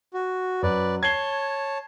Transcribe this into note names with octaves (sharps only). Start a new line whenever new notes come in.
F#4
F#2 B4 D5
C#5 A5 G#6 C7 G7